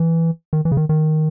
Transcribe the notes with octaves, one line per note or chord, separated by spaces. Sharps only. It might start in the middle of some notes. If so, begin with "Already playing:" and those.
Already playing: E3
D#3
E3
C#3
D#3
D#3